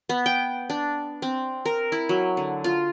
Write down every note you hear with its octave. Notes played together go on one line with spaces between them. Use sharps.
B3
G5
D4
C4
A#4
E4
F#3
D3
F4